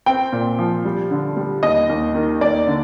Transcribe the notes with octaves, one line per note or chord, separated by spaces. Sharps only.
C4 G5
A#2
F3
G3
D3
G3
D#2 D#5
D#2
D#3
D#2 D5
D3